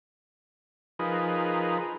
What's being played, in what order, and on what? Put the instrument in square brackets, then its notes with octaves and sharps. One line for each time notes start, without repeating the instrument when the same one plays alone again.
[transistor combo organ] F3 D#4 G#4 A#4 B4